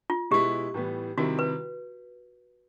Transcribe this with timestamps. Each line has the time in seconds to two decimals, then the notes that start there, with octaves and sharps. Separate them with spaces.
0.10 F4
0.31 B2 G#3 B3 E4 G4
0.74 A2 E3 G3 B3
1.18 C3 D#3 G3 C4 E4 F#4
1.39 B4